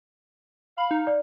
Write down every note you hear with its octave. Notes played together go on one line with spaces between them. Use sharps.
F5 B5
D#4
D5